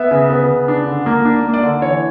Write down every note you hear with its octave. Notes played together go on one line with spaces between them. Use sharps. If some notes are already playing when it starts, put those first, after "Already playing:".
Already playing: B3 E5
C#3
B3
C#3
D4
D3
A#3
D4
A#3
D5
D3
E3 C#5